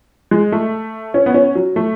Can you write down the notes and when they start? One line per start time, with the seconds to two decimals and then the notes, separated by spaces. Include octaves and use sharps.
0.31 G#3
0.52 A3
1.14 C#4
1.26 B3
1.34 C#4
1.55 F#3
1.76 A3